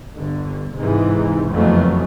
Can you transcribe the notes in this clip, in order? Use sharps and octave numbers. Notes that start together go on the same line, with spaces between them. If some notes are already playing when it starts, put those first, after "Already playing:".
G1 D3
G#2 C3 E3
F#1 F2 E3 F#3 A3 B3